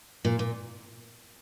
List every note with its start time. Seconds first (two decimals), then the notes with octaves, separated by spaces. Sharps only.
0.25 A#2
0.39 A#2